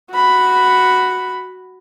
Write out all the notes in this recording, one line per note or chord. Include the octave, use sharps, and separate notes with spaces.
F#4 B5